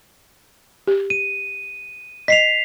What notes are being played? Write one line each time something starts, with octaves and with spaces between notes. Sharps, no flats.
G4
D#7
D#5 B6 C7 F7